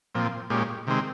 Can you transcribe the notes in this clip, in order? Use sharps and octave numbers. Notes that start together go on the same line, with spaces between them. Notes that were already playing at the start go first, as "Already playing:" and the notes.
A#2 F3 C4
A#2 G#3 C#4 G4
C3 D#3 G#3 C4